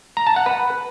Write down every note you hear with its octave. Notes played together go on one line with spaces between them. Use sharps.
A#5
A5
F#5
B4